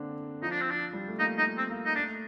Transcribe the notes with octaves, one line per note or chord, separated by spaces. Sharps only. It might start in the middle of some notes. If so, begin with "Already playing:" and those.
Already playing: D3 A#3 C4 D4
F3 D#4
D4
C4
F3 D4
G3
A3
A#3 D#4
D#4
A#3
C4
A#3
D#4
A3 D4